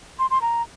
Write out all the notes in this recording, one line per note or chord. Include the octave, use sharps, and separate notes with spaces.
C6
C6
A#5